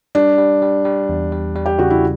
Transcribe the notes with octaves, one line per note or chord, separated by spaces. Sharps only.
G3 D4
G3
G3
G3
E2
G3
G3
G4
C#3 F#4
E4